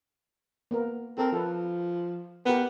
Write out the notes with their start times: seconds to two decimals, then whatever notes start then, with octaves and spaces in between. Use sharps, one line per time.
0.71 A#3 B3 A#4
1.18 C4 A4 A#4
1.33 F3 A4 B4
2.46 B3 G4 A#4 B4